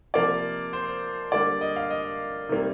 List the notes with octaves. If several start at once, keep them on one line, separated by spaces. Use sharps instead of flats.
C3 F3 A#3 D5
C5
D3 G3 A#3 D5
D#5
F5
D#5
C3 D#3 G3 A#3